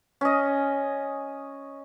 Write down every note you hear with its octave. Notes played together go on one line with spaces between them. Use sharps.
C#4 D#5